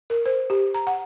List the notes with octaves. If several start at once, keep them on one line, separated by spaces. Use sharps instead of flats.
A#4
C5
G4
A#5
F#5